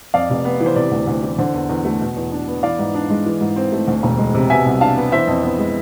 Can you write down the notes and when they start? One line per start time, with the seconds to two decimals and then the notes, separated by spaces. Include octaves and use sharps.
0.14 F2 D5 F5
0.30 F1
0.45 B3
0.60 E3
0.66 C5
0.76 C3 D5
0.91 D2
1.07 D2
1.23 E3
1.38 D3 C5
1.54 E2
1.69 E2
1.85 A3
2.01 B2
2.16 E2
2.32 D4
2.48 B3
2.63 E3 D5 F5
2.79 G#2
2.94 D4
3.10 G#3
3.26 E3
3.41 G#2
3.56 C4
3.72 A3
3.87 D2
4.03 E1
4.19 G#3
4.34 C3
4.50 B2 E5 G#5
4.66 C2
4.81 D4 F5 A5
4.97 B3
5.12 E3 C5 E5
5.27 F2
5.43 B3
5.59 G#3